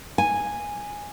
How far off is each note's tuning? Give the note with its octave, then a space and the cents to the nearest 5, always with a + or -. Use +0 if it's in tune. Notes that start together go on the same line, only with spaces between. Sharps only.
G#5 -5